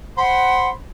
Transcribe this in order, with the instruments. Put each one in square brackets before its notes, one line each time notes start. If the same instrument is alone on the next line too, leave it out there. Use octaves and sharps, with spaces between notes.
[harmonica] C5 B5 C6 [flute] F#5